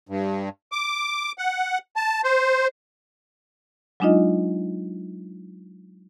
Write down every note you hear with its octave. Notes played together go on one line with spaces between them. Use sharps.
G2
D6
F#5
A5
C5
F#3 G#3 D4 D#4 F4 D#5